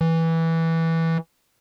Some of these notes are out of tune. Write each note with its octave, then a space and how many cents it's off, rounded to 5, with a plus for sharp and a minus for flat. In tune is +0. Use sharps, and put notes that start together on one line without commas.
E3 -10